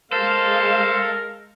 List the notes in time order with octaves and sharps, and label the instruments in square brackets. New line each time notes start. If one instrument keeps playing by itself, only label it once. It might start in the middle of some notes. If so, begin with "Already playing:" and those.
[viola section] G#3 F5 [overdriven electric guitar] A4 [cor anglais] A#4 [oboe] C5